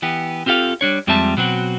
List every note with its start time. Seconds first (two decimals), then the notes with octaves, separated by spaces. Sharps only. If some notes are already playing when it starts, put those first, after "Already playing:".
0.02 E3 B3 G4
0.46 C4 F4 G4 A4 F5
0.81 G3 D4 C#5
1.07 F2 G3 G#3 C4 E5 A5
1.37 B2 F#3 C4 F#4